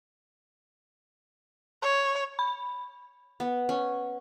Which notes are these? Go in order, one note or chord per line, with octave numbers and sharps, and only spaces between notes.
C#5
B5
B3
C#4